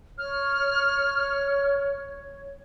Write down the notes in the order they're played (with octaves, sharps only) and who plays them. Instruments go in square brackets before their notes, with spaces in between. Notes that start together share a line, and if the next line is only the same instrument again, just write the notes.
[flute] C#5 [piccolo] F6